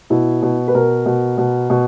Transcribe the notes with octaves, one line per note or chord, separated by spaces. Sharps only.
B2 E4
B2
B4
B2 A#4
B2
B2
B2